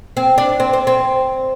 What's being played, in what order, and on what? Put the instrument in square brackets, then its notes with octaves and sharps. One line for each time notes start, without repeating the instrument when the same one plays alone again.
[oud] C4
D4
C4
C4
C4